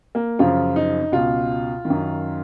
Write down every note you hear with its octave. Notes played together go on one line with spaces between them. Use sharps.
A#3
F#2 C#3 F3 F4
D#4
C#2 B2 F4
D#3
F#2